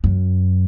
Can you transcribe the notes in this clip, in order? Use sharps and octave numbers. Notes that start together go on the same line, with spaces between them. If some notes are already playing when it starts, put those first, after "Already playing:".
F#2